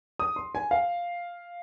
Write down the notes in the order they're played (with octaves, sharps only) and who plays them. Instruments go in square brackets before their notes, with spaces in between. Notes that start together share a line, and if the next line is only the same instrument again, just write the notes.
[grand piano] D#6
C6
G#5
F5